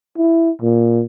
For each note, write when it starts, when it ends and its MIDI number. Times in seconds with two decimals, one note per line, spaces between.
0.18 0.51 64
0.62 1.03 46